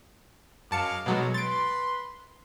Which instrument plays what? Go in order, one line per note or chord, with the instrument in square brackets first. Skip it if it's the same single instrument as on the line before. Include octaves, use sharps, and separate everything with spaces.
[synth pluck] F#2 A5 C#7 [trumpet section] G#3 F5 D6
[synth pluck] B2 F#3 G#3 [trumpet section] D#4 A4 C#5
[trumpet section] B4 C6 [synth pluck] A6 D7